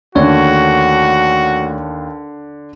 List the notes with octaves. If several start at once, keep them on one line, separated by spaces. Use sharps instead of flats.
D#2 D3 A3 F#4 C#5